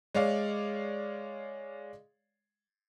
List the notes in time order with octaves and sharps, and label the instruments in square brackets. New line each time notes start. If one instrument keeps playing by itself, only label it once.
[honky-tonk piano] G#3 C#5 D5 F5